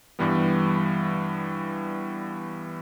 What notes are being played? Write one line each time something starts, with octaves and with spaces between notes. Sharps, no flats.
G2 E3 G3 B3